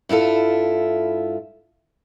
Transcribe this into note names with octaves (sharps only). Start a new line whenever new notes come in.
G2 E4 F4 A4